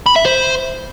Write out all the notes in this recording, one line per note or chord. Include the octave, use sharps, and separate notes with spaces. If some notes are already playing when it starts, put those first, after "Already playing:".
B5
E5
C5